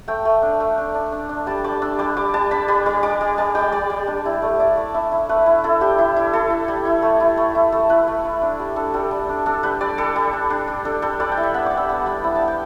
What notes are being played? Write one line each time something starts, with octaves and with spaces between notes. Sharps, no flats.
A3 G5
A3
D4
A3
D4
D4
D4
D4
G3 A5
G3 D6
D4 E6
G3 D6
G3 D6
G3 A5
D4 B5
G3 B5
G3 D6
G3 D6
G3
G3 A5
G3 G5
G3 D5
G3
D4
E4
A3
E4 D5
A3 D5
E4 E5
E4
A3 B4
E4
E4 A4
G3 G4
E4
E4
E4 A4
E4
G3
E4
A3
E4
A3
E4
A3 A4
E4 B4
A3
E4
D4
G3
D4 A4
G3 A4
G3
D4
D4 A4
G3 B4
G3 D5
G3 A4
G3
D4
D4
D4
D4 A4
G3 A4
G3 D5
G5
E4
E5
B3 B5
D6
G3
E6
B3
G3 B5
E4 B5
A5
B3
G5